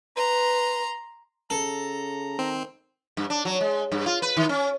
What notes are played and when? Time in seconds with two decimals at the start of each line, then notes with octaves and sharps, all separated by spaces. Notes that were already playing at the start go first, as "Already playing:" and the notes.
0.16 B4 A#5 C6
1.50 C#3 A4 A#5
2.39 D#3 C4
3.17 G2
3.30 D4
3.45 F#3
3.61 G#3
3.92 G2
4.06 F4
4.22 B4
4.37 D#3
4.49 C#4